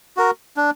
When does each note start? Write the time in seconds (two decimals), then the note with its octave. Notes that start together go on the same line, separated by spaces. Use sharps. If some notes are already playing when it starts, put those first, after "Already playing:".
0.17 F#4 A#4
0.57 D4